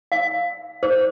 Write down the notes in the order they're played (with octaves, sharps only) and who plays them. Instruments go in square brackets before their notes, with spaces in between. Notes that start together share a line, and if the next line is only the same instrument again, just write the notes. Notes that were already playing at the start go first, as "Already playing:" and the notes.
[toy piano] F5
C5